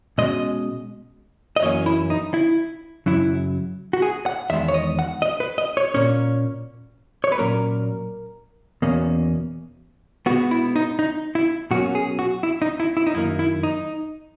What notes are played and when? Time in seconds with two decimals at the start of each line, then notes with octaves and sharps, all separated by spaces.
0.18 B2 G#3 C#4 D#5
1.56 D#5
1.62 F#2 E3 A#3 C#4 C#5
1.86 E4
2.10 D#4
2.34 E4
3.06 F#2 C#3 F#3 E4
3.93 F#4
4.02 G#4
4.26 F#5
4.50 E2 D#3 G#3 E5
4.68 C#5
4.74 D#5
4.99 F#5
5.22 D#5
5.40 B4
5.58 D#5
5.77 C#5
5.94 A#2 A#3 C#4 C#5
7.24 C#5
7.32 B4
7.38 A#2 F#3 A#3 C#4 A#4
8.82 E2 B2 A#3 C#4
10.26 B2 G#3 B3 F#4
10.51 E4
10.76 D#4
10.99 D#4
11.35 E4
11.71 B2 F#3 A#3 C#4 F#4
11.95 G#4
12.19 F#4
12.43 E4
12.62 D#4
12.80 E4
12.97 E4
13.07 D#4
13.15 F#2 D#3 A#3 E4
13.39 E4
13.63 D#4